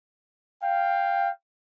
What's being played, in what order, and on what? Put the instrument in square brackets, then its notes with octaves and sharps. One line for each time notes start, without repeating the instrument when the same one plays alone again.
[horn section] F5 G5